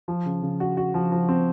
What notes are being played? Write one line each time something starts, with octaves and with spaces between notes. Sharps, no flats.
F3
C#3
C#3
F#4
F#4
F3
F3
C4